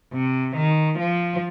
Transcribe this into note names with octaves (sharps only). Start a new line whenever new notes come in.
C3
D#3
F3